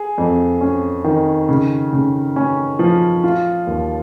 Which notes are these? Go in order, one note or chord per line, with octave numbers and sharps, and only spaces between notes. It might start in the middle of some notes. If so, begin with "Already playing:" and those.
Already playing: G#4
F2
C#4
D#3
C#3
C#3
C#4
F3
F4
D#2